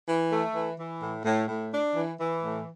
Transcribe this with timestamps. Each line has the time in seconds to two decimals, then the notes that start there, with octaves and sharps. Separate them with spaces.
0.07 E3
0.31 A3
0.54 E3
0.78 E3
1.01 A2
1.25 A2
1.48 A2
1.72 D4
1.96 E3
2.19 E3
2.43 A2